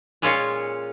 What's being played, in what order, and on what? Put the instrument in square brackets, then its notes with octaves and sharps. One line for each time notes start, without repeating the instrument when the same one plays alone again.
[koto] A#2 G#3 C#4 F4